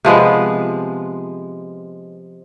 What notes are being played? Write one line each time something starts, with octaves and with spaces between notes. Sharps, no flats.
C3 F3 G#3 B3